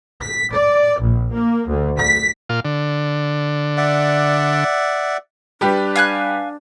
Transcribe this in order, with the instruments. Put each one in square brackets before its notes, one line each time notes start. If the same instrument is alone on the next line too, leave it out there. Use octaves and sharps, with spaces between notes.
[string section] B6
D5
A#1
A#3
D2
B6
[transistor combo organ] A#2 F4
D3
[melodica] D5 E5 F#5
[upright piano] G3 G4 B4 [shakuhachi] D4
[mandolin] F5 G#5 F#6